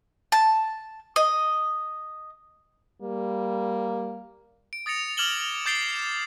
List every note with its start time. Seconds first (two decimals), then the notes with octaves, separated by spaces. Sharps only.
0.32 A5
1.16 D#5
3.02 G3 A#3
4.73 D7
4.86 D#6 A6 A#6 C#7 F7
5.17 D6 F6 G#6 E7 F#7 G7
5.43 F#7
5.66 D6 G6 A6 C7 D7 G7
5.94 E7